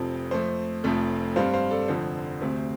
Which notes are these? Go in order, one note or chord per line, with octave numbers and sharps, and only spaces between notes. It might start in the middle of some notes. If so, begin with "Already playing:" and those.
Already playing: F1 F2 C3 F3 C4 C5
F2 F3 A3 C5
F1 F2 F3 A3 C4
G2 G3 C4 C5 F5
C5 F5
A4 D5
F1 F2 D3 F3 C5
D2 C3 A3 C4